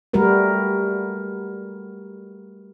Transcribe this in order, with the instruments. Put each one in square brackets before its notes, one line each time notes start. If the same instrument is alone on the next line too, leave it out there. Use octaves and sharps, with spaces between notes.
[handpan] G3 A3 F#4 A#4 B4